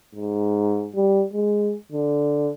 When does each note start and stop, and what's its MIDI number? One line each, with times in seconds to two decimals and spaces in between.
0.15 0.89 44
0.96 1.24 55
1.33 1.76 56
1.92 2.52 50